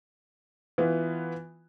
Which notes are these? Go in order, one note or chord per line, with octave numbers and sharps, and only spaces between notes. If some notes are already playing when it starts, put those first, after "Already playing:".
E3 B3 F4